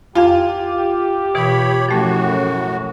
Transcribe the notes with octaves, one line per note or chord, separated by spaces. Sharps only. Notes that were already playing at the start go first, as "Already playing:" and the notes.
F2 F4 G4 F5 G#5
B2 E3 C#5 B5
F#2 A2 F3 A3 F#4